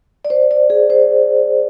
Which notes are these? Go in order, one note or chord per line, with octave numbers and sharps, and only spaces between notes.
D5
C5
D5
G#4
C5